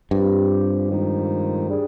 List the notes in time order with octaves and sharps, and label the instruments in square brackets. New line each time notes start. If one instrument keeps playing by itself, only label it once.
[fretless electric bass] G2 [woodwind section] F3 C4 G4
[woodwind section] F2 D#3 G#3 D#4
G3 D4 G#4